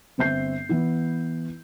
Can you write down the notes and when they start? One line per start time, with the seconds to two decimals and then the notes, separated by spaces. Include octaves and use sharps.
0.18 G1 C4 E5 G6 C7
0.69 E3 B3 E4